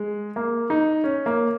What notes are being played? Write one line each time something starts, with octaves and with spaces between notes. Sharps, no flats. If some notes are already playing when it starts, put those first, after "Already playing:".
Already playing: G#3
A#3
D#4
C#4
A#3